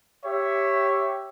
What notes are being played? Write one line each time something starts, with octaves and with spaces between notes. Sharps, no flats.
G4 C#5 E5